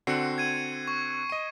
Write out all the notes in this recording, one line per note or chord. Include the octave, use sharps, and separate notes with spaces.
D3 C4 F#4 C7 C#7
G#6 D#7
C#6
D#5 D#7